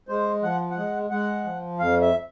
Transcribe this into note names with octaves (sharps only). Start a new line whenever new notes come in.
G#3 C5
F3 F#5
F#5
G#3
G#3 F#5
F3
F2 F5
E5